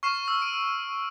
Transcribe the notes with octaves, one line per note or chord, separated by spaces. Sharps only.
C#6 F6 C7 E7
E6
D7 D#7